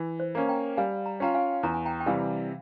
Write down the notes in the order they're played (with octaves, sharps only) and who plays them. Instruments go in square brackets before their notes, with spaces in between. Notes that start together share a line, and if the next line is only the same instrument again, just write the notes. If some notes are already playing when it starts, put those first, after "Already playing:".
Already playing: [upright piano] E3
[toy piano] C5
[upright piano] A#3 C#4
[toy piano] G5 A#5
[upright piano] G3 [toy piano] F5 G#5
[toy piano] A#5
[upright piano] C#4 F4 [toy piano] G5 A#5
[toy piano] F5 G#5
[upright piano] E2 [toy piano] A#5
[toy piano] G#5
G5 A#5
G5
[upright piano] C3 E3 G3 [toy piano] F5 G#5